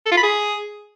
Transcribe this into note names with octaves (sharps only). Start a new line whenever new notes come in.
A4
F4
B5
G#4